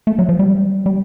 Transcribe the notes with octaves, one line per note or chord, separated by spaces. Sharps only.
A3
F#3
F3
G3
G3